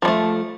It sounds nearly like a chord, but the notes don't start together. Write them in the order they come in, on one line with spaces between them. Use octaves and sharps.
F3 G3 A3